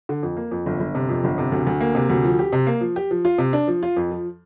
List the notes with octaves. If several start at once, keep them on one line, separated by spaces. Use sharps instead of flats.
D3
F2
A#3
F2
G1
G1
C3
F2
G1
C3
D2
D2
A#3
C3
D2
F3
G4
C3
A#3
F3
G4
F3
F4
C3
D4
F3
F4
F2
F3